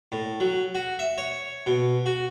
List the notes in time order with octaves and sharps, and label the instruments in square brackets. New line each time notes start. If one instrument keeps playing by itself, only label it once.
[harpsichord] A2
F#3
F#4
E5
C#5
B2
F#4